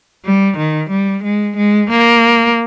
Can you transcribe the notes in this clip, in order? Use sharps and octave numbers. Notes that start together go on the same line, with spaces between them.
G3
D#3
G3
G#3
G#3
A#3